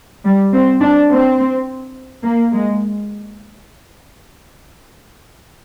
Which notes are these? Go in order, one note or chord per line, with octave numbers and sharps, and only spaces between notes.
G3
C4
D4
C4
A#3
G#3